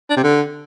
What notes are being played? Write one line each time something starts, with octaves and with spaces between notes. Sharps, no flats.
D4
C3
D3